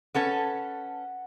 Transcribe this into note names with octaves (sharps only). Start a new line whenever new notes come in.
C#4 A4 B4 F#5